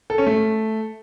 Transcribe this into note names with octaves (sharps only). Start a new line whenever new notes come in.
A4
C#4
A3